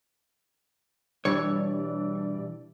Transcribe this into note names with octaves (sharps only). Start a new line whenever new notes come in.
B2 E3 G3 D4 C#5 D5